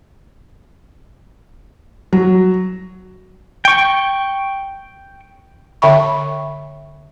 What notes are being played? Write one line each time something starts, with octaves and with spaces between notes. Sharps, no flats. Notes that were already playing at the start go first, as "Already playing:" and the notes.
F#3
G5 C#6
D3 C#5 E5 G5 B5 C#6